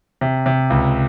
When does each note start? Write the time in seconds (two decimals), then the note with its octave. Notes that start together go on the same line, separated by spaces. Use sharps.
0.21 C3
0.46 C3
0.70 C#2